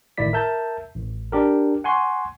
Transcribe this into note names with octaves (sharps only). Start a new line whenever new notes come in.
G1 A2 D#3 E4 D5 B6
A#4 E5 A5 G6
A1
D4 G4 A#4
F#5 G#5 C6 C#6